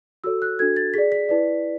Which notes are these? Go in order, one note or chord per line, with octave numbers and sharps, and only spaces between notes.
F#4 A4 C#5 E6
F#6
D4 F#4 A4 G#6
A6
G#4 D5 B6
B6
E4 B4 D5